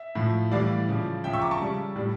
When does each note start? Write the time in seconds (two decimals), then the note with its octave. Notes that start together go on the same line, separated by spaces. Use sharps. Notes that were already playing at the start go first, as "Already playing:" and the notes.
Already playing: E5
0.15 A2 F3
0.51 A2 E3 G3 D5 F5
0.88 C#3 F3
1.24 C#3 F3 E5 G5
1.33 C#6 E6
1.41 A#5 D6
1.51 A5 C#6
1.59 C#3 G3
1.96 A2 G3